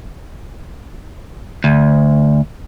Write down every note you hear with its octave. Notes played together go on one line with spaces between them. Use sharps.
D2